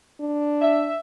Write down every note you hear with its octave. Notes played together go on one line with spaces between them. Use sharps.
D4
E5